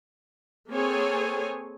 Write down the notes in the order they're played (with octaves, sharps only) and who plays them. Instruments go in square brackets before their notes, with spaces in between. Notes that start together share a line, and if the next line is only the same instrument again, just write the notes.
[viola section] A#3 C4 G#4 A4 C#5 G#5